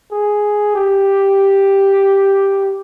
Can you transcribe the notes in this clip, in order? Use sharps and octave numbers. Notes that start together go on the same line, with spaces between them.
G#4
G4